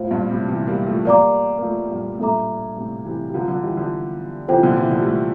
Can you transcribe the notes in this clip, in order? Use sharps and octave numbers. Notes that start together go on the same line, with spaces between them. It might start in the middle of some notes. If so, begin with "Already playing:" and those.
Already playing: A2 F4 C5 F5
G2 A#2
A2 C3
C3 E3
G3 A#3
F3 A3
G3 A#3 A#4 D5 F5 A#5 D6
A#3
F3 A3
G2 A#2
A2
G2 A#2 D4 A4 E5 A#5 D6
A2 C3
C3 E3
G3
D3 F3 A#4 F5 A#5
D3 F3
E3 G3
D3 F3
C3 E3 F4 A4 C5 G5
A#2 D3
C3 E3
D3 F3
G3
F3 A3